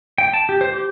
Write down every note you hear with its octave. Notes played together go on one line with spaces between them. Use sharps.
G5
A5
G4
C5
G4